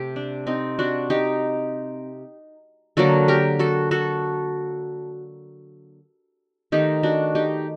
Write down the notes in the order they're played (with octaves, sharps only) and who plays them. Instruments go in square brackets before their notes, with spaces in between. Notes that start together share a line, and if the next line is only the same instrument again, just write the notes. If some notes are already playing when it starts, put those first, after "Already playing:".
Already playing: [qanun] C3 A3 G4
D4
C4 D#4
D4 F#4
D#4 G4
D3 F#3 A#3 F#4 A4
G4 A#4
F#4 A4
F#4 A4
D#3 A3 D#4 G4
D4 F#4
D#4 G4